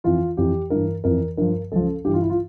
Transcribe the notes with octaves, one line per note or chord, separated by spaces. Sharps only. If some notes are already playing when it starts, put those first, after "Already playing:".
F2 E3 F4
F2 E3 G4
G2 E3 A#4
F2 E3 A#4
G2 F3 A#4
C#2 C#3 F3 A4
G2 E3 G4
F4
E4
F4